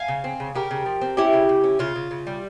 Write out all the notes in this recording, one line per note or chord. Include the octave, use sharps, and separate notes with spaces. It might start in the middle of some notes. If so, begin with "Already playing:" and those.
Already playing: F5 G#5
C#3
C4
C#3
C#3 G4 A#4
C#3
F3
C4
C#4 E4 G4
C#3
C#3
C#4
C#3 F4
C#3
C#3
G3